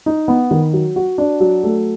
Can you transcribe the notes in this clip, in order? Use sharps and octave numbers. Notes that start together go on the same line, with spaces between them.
D#4
B3
D#3
F#3
F#4
D4
F#3
A3